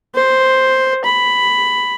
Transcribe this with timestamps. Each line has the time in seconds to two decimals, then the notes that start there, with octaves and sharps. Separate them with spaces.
0.15 C5
1.05 B5